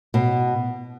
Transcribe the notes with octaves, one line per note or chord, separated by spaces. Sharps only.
B2